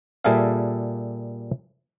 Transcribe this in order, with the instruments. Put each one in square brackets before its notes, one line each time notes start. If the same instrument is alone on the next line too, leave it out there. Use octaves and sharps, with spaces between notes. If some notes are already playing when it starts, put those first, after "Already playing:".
[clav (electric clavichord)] A#2 G3 G#4 A4 E5 F5